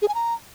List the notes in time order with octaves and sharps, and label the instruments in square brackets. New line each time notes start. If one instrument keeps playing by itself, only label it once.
[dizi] G#4
G#5
A#5